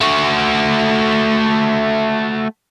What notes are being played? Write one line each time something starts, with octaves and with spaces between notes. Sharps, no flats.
A3 F#4